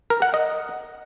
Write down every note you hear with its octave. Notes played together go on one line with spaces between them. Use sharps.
A#4
F#5
D#5